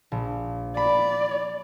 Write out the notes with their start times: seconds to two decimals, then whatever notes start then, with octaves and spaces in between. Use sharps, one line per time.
0.12 A#1
0.77 D5 B5